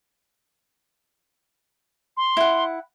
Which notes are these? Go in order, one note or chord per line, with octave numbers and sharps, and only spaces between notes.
C6
E4 F#5